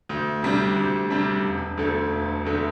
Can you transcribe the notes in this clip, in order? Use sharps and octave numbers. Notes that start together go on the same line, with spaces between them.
D2
C3 G3 D4
D2
C3 G3 D4
E1
D2 D3 A3
E1
D2 D3 A3